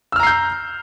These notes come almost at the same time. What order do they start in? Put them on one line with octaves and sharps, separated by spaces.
E6 F6 A#5 C7 G6